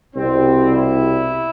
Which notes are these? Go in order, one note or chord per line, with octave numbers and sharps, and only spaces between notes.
C2 B2 G3 C4
E4